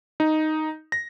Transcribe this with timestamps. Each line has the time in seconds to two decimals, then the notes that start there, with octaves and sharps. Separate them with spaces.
0.20 D#4
0.92 A#6